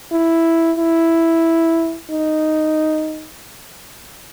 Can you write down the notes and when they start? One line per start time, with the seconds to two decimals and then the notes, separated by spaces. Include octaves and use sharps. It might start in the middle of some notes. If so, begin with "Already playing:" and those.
0.12 E4
0.78 E4
2.10 D#4